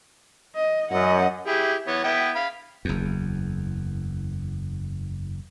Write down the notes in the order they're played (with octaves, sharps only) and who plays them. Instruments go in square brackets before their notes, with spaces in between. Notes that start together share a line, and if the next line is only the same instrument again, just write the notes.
[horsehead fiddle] D#5
[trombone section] F#2 [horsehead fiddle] D#5 F#5
[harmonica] E4 G4 G#4
E3 B3 C#5
B3 E4 G5
F5 B5
[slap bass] F#1 E2